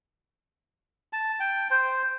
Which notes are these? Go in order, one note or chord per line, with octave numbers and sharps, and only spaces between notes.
A5
G5
C5